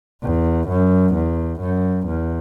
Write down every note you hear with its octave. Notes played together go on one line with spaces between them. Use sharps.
E2
F#2
E2
F#2
E2